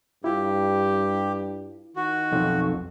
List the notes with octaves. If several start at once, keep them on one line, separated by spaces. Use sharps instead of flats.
G2 E4 F4 G4
D#3 F#4
B1 F2